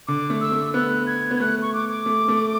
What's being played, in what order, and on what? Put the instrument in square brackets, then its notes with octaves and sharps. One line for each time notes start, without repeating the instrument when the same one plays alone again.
[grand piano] D3 [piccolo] D6
[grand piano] A3
[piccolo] E6
[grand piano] A3
[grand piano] B3 [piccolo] F#6
[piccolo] G#6
[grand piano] B3
[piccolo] G#6
[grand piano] A3 [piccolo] F#6
[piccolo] C#6
D6
D6
[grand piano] A3
A3